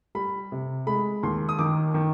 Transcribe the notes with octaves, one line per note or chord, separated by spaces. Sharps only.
G3 B5
C3
G#3 B5
D#2 C6
D#6
D#3 D6
D#3